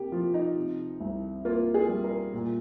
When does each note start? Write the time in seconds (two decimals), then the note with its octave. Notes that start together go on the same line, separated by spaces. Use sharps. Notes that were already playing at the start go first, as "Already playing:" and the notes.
Already playing: C3 A#3 G4
0.12 F3 F4
0.34 D#4
0.56 C3
1.00 C2
1.45 A#3 F4
1.74 G#4
1.89 G3
2.04 A#4
2.34 A#2